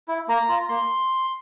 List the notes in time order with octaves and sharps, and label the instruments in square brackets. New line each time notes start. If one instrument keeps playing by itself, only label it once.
[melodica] E4
A#3 A#5
F4
A#3 C6